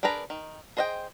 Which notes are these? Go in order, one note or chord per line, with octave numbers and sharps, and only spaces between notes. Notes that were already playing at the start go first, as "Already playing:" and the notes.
D4 G#4 A#4 B4 A#5
D#3
G#4 C5 D#5 F5 G5